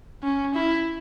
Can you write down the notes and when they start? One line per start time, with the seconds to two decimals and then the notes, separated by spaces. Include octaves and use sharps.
0.23 C#4
0.54 E4